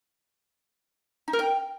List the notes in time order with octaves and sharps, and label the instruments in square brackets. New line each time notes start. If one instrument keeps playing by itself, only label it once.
[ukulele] D#4
A#4
G5